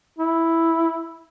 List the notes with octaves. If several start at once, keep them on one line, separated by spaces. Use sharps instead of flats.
E4